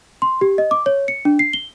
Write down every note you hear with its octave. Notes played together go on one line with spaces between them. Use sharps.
C6
G4
D#5
D6
C#5
C#7
D4
C7
G7